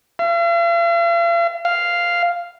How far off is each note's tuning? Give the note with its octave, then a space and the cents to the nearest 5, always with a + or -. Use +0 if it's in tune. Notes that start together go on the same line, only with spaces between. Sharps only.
F5 -45
F5 -5